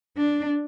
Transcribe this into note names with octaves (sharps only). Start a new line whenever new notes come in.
D4